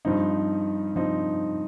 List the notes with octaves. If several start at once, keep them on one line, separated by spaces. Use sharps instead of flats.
G2 F3 C4 D#4
G2 F3 C4 D#4